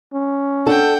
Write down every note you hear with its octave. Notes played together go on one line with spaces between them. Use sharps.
C#4
D4 A4 F#5 G5